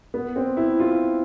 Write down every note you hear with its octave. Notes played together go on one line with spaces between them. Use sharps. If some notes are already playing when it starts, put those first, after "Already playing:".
B3
C4
E4
F4